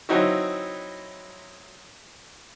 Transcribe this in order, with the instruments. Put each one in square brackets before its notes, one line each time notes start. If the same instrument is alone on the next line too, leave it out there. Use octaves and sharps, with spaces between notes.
[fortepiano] F#3 C4 D#4 E4 F#4